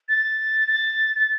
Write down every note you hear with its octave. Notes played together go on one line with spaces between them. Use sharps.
A6
A6
A6